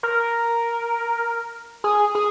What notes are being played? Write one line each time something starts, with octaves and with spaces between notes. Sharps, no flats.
A#4
G#4
G#4